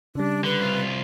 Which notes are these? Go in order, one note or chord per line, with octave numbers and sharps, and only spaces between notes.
C#3 G3 D4
D3 B4
C2 F4